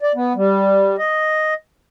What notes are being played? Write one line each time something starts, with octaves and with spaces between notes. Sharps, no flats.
D5
B3
G3
D#5